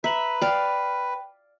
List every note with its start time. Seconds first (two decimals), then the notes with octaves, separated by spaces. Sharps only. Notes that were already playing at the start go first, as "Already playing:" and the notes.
0.04 B4 E5 A#5 F#7
0.42 D5 F5 G5